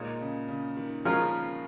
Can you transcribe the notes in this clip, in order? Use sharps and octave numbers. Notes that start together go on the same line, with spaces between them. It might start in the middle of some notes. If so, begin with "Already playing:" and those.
Already playing: A#2 G#3 D#4 C#5
C#3
C#3
D#3
F3 G#3 C#4 F4 A#4